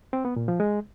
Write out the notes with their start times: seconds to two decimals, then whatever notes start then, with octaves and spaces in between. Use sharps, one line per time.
0.13 C4
0.25 B3
0.36 A#2
0.48 F3
0.60 G#3